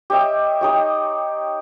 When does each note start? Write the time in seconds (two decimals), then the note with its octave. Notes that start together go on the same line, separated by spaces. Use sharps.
0.10 G4 C#5 D#5 E5
0.61 D#4 G4 C#5